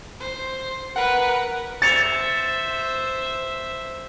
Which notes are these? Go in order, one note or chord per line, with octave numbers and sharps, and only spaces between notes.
C5
A#4 B4 F#5
C5 E5 A6 C#7 F7